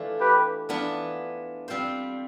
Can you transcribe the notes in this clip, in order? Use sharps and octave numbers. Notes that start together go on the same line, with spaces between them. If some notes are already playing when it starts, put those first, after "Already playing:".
Already playing: E3 A3 D4 F4
G4 B4
E3 B3 D4 F4
G3 C4 F4 C5